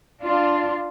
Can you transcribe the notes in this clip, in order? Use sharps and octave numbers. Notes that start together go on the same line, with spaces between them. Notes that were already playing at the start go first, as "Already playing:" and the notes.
D4 F4